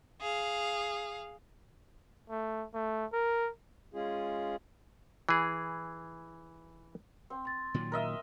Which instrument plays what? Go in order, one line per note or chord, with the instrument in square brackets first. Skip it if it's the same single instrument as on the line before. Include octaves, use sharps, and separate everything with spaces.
[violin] G#4 F5
[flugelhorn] A3
A3
A#4
[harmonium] G#3 C#4 F4 G#4
[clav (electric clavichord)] E3 G#4
[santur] C4
[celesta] C6 A6
[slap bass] A#2 D#3 F#3
[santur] A#4 D#5 E5